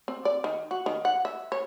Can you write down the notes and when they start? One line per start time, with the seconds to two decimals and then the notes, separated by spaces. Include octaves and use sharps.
0.08 C4
0.25 D5
0.44 D#3
0.71 F#4
0.86 D#3
1.05 F#5
1.25 E5
1.52 C#5